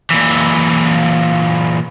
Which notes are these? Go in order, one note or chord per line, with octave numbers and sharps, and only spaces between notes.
A#2 E3